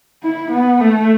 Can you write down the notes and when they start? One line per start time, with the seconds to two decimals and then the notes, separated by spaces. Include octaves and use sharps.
0.23 E4
0.51 B3
0.81 A3